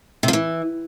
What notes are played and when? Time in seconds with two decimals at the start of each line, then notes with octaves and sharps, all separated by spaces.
0.23 C3
0.28 F3
0.33 E3